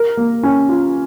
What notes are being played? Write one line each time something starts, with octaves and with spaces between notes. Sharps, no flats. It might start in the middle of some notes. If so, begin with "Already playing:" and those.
Already playing: A#4
A#3
C#4
F4